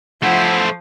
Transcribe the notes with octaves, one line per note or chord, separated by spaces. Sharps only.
F3 A3 E4 C5 F#5